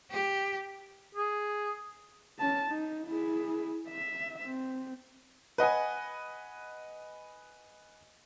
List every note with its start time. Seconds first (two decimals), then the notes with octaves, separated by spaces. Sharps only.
0.11 G4
1.15 G#4
2.39 C#4 A5
2.71 D#4
3.07 E4 G#4
3.88 E5
4.42 C4
5.58 B4 D#5 F#5 G#5